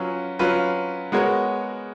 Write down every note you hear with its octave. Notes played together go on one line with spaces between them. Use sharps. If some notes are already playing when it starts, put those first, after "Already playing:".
Already playing: F#3 C#4 F4 B4
F#3 C#4 F4 B4
G#3 B3 F#4 A#4 C#5